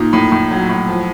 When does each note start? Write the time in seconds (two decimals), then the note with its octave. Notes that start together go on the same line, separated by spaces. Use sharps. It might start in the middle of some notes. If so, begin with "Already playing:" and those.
Already playing: A#2 D#4
0.13 A2
0.32 A2
0.51 F#3
0.69 A2
0.88 F3